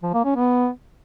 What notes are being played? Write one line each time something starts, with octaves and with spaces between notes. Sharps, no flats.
F3
A#3
C#4
B3